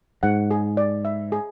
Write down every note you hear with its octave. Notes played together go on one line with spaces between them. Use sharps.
G#2 F#5
G#4
D5
E5
G#4